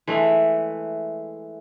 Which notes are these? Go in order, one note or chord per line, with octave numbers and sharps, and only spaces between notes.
E3 G#3 A3